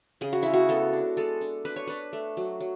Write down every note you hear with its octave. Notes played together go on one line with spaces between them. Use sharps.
C#3 G#4
F#4
G#3 E4
F#4
B3 A4
D4
G#3 A4
D4
D4 B4
C#5
D4 B4
A3
F#3
F#3